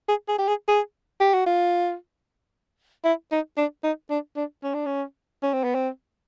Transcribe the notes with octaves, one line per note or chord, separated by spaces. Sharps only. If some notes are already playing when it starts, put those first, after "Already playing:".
G#4
G#4
G4
G#4
G#4
G4
F#4
F4
E4
D#4
D4
D#4
D4
D4
C#4
D4
C#4
C#4
C4
B3
C4